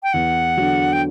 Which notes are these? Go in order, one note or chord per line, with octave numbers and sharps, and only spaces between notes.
G5
E2 F#5
D3 F#3
G5